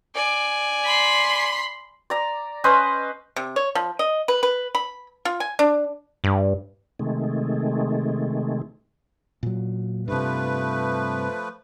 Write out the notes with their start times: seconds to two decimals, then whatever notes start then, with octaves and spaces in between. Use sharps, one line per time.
0.15 D5 G#5
0.85 B5 C6
2.10 D5 A#5
2.64 C#4 B4 C5 D#5
3.36 C3
3.56 C#5
3.75 F3
3.99 D#5
4.28 B4
4.43 B4
4.75 B5
5.25 F4
5.40 G#5
5.59 D4
6.24 G2
6.99 C3 D#3 G#3 A3
9.43 A#2 F#3
10.08 G2 C3 F3 A3 B4